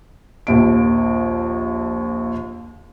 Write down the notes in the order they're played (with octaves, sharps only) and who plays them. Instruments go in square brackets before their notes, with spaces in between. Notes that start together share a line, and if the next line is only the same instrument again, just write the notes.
[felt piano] A#1 D#2 D7